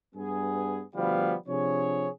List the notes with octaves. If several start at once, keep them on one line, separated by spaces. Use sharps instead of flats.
G2 B3 G#4
D2 B2 F3 G3 B3 F5
C3 F3 D4 G#4 C#5